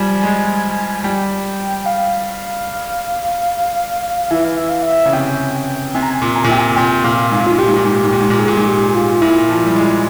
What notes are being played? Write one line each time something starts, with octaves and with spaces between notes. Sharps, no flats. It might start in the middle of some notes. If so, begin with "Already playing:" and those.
Already playing: F3 G3 G#5
G#3
G3 G5
F5
E3 E5
F5
E5
F5
E5
C#3
C3 G5
C3 G#5
A#5
G#5
A#2
A#5
A#2 G#5
C3 G5
G#5
A#2 G5
A#2 F5
G#2 F5
A#2
G#2 F4
A#2 G4
G#2
A#2
G#2
A#2
G#2
A#2
G#2
A#2
G#2 G#4
A#2
G#2
G4
F4
A#2 E4
F3
G3
G#3